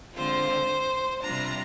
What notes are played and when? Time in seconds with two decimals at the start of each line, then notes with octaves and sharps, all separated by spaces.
0.15 D3 G#3 C4 F4 C5
1.22 C3 G3 D4 F4 A#5